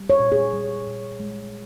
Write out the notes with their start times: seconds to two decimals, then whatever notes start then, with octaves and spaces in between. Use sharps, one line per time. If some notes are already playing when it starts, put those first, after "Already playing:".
Already playing: G3
0.10 C#5
0.20 A#2
0.32 G#4
0.53 G3
0.87 A#2
1.20 G#3